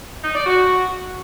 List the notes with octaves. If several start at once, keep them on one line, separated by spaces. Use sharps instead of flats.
D#4
D5
F#4